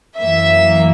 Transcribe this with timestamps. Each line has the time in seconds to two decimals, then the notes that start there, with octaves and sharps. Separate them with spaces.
0.19 F#2 E3 A#3 E5